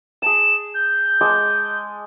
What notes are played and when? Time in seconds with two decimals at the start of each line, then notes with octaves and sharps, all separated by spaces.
0.22 G#4 A5 E7
0.74 G6
1.21 G#3 A5 D6